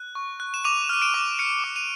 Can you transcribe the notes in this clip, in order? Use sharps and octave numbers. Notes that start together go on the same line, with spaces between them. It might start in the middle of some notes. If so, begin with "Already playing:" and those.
Already playing: F#6
C#6
F#6
E7
D6 D#7 F7
F6 D#7
D7 E7
D6
F6 C#7 D#7
D6
D#7 F7